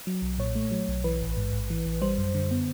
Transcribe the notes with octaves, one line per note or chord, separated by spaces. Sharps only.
F#3
B1
A#2 C#5
A3
F#3
B1
E3 B4
A1
G#2
A1
E3
A1
G3 C5
F#2
D3
B3